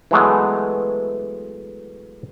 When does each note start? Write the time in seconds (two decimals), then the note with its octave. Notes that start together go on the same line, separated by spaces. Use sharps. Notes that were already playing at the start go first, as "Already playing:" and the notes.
0.11 E3 F#3 G#3 A3 B3